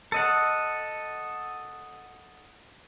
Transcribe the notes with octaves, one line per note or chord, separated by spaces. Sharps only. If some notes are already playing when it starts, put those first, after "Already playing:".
A4 D#5 F#5